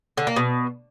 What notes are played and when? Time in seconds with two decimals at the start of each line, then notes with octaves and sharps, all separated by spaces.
0.18 D3
0.27 A#3
0.37 B2